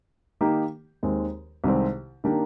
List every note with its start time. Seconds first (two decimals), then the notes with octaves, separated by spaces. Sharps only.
0.41 D#3 A#3 D#4 G4
1.03 D#2 D#3 G#3 C4
1.64 C2 C3 D#3 G#3 C4
2.24 D#3 A#3 D4 G4 A#4